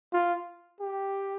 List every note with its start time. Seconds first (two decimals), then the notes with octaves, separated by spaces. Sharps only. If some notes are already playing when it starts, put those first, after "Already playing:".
0.13 F4
0.81 G4